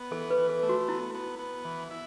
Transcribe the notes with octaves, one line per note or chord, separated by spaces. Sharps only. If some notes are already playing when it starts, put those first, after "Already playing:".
Already playing: B3
E3 A4
B4
E3
A4
A3
F#4
B3 E4
B3
B3
E3
E4